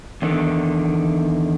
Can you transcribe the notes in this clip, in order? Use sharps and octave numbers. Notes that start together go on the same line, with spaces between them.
E2 D3 D#3